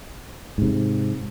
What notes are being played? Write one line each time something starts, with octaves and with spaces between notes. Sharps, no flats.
G#2 C3